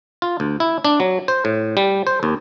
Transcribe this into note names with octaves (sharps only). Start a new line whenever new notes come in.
F4
D2
E4
D4
F#3
C5
A2
G3
C5
D#2